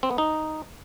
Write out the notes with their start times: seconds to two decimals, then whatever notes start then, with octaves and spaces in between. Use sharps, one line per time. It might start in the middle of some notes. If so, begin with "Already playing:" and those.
0.03 C4
0.11 B3
0.18 D#4